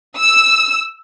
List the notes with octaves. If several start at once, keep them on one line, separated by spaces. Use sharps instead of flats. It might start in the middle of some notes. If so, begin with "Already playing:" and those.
E6